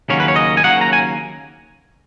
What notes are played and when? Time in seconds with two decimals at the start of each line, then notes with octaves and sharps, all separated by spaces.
0.09 D#2 C#3 F#3 A#3 C#4 C#5
0.20 B4
0.28 C#5
0.36 D#5
0.57 G#5
0.63 D#2 C#3 F#3 A#3 C#4 F#5
0.81 A#5
0.93 G#5